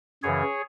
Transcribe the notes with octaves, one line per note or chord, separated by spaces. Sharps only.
F#2 C#3 E3 G#4 C#5